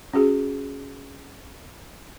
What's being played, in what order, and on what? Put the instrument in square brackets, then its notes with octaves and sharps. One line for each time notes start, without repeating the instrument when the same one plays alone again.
[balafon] C#4 F#4 G#4